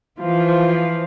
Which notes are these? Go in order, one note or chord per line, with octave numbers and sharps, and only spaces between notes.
E3 F3 F4